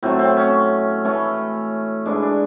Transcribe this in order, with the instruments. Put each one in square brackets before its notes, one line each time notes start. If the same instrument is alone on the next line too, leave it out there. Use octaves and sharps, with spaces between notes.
[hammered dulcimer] A2 F#3 A3 C4
C4
C#4
A2 E3 A3 C#4
G#2 E3 G#3 D4
D4